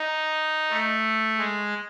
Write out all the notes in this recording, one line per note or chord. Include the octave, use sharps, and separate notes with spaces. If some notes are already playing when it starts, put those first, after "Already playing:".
Already playing: D#4
A3
G#3